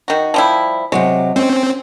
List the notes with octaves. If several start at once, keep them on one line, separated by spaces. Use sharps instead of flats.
D#3 F#4
F3 G3 E4
C3 F#3 G#3 C#5
C4 C#4